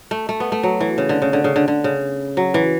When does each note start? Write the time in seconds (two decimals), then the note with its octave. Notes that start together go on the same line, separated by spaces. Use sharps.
0.11 A3
0.29 A3
0.40 B3
0.52 A3
0.63 F#3
0.80 E3
0.98 C#3
1.09 D3
1.22 C#3
1.33 D3
1.44 C#3
1.56 D3
1.68 D3
1.84 C#3
2.37 F#3
2.54 E3